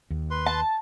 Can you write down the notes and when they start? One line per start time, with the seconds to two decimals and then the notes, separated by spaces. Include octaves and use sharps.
0.10 D#2
0.31 B4 C6
0.46 A5